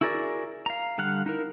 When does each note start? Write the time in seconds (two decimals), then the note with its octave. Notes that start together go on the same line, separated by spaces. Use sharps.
0.01 E4 F#4 G#4 A#4 D5
0.66 F5 A#5
0.98 D3 G3 F5 F#5 F#6
1.26 D#4 E4 A#4